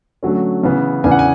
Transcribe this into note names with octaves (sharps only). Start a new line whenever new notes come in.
D3 F#3 A3 C#4
C#3 E3 B3
E2 C#3 E3 B3 D4 G#5
F#5
G#5